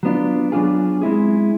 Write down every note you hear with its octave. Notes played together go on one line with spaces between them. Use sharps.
F#3 B3 D4 F4
F#3 B3 D4 F4 G#4
G#3 C4 E4 G#4